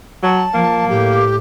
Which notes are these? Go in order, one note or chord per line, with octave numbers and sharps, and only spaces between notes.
F#3 A5
F3 A#3
A2 G4